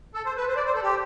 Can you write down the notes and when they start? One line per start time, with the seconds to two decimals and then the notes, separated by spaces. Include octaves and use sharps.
0.14 A4
0.25 C5
0.37 B4
0.48 C5
0.56 D5
0.66 C5
0.74 A4
0.83 G4